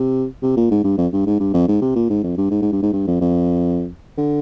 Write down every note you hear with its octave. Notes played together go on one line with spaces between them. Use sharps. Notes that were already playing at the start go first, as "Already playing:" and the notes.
Already playing: C3
C3
A#2
G#2
G2
F2
G2
G#2
G2
F2
G#2
C3
A#2
G#2
F2
G2
G#2
G#2
G2
G#2
G2
F2
F2
D3